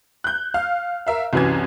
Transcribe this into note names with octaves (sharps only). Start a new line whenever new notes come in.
F#6 G6
F5 F6
A#4 E5 F5
C2 F#2 E3 F#3 G#6